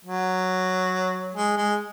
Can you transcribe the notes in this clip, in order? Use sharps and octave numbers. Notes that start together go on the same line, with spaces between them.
F#3
G#3
G#3